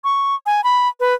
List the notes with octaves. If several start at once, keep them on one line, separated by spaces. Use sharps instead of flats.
C#6
G#5
B5
B4